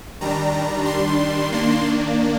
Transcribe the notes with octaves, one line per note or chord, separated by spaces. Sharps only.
D#3 G3 D4 A#5
C6
D#3 A#3 D4 C6